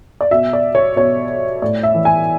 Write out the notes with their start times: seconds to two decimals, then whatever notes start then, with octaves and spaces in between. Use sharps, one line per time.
0.21 D5
0.31 B2 E5
0.53 D5
0.75 C#5
0.96 B2 C#5
1.62 A2 D5
1.83 E5
1.95 E3
2.05 G#5